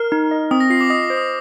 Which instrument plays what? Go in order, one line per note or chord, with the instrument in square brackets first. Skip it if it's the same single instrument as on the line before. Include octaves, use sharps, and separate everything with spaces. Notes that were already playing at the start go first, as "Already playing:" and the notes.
Already playing: [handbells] A#4 [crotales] F6
[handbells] D#4
D#5
[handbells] C4 [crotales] D#6
[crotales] A#6
[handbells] F4 [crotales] C7
[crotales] D6
[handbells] D#5 [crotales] D#6
[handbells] C5
[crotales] D#6